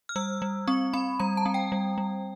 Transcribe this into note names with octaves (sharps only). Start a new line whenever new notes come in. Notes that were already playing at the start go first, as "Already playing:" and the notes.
F6
G3 E6
G3
C4 C#6
C4 B5
G3 A#5
A5
C4
G5
G3
G3